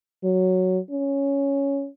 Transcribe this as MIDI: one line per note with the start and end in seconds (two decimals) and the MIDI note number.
0.24 0.79 54
0.91 1.89 61